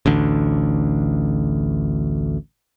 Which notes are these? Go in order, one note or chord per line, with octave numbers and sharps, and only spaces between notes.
A1 D2 D3